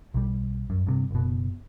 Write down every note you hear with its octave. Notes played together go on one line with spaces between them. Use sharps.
B1 G3
F#2
G2 C3
F#1 B2